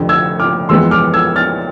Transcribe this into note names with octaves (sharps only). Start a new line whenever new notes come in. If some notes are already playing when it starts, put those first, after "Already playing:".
Already playing: F1 F2 D3
E6 G#6
D6 F6
F2 E3 G#3 B3 C6 E6
D6 F6
E6 G#6
F6 A6